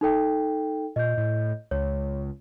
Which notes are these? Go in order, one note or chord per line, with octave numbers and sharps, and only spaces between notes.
D#4 A4 G5
A#2 D#5 G6
A2
C#2 C#5